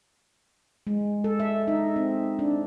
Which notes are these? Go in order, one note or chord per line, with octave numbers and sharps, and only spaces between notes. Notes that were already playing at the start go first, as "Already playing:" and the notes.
G#3
A4
E5
D#4
C4
D4